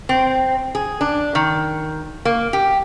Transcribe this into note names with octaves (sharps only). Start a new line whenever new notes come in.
C4
G#4
D4
D#3
A#3
G4